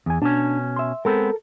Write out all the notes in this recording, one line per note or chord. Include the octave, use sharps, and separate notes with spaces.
E2 G#5
B2 C#4 D4
E5 C6
G#3 B3 C4 A4 A#4